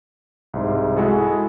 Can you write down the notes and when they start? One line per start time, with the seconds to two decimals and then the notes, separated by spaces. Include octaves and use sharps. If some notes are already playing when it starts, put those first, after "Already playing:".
0.54 C2 G#2
0.97 G#3 E4 F#4 G#4 A4